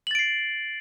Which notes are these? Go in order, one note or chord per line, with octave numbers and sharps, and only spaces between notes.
A6 C7 D7 F#7